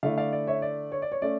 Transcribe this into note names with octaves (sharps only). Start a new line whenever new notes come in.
D3 A3 E4 D5 F5
D5 F5
D5
C#5 E5
D5
C#5
D5
C#5
A3 C#4 D5